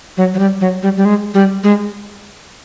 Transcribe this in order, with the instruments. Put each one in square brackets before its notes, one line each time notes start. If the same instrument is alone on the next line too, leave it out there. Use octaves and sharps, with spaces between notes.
[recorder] F#3
F#3
G3
F#3
G3
G3
G#3
G3
G#3